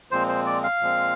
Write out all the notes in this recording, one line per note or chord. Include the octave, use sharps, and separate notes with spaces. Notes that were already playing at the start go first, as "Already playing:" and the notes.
A#2 F3 G#3 C4 C5
C5
D5
F5
A#2 F3 G#3 C4